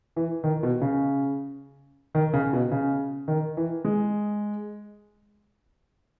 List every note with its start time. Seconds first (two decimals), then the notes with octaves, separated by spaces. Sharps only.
0.16 E3
0.44 D#3
0.63 B2
0.81 C#3
2.15 D#3
2.33 C#3
2.53 B2
2.71 C#3
3.28 D#3
3.57 E3
3.85 G#3